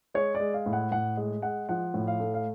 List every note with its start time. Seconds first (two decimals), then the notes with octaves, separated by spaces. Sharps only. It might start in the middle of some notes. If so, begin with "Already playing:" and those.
0.14 G#3 C#5
0.35 D5
0.40 G#3
0.54 F5
0.66 A2
0.73 F#5
0.91 A2 F#5
1.17 G#3
1.42 G#3 F#5
1.69 F3 F#5
1.94 A2
2.07 F5
2.20 A3
2.34 F5